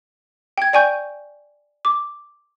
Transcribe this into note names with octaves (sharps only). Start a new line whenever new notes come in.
G5 G#6
D5 G5 G#5 C#6 G6
D6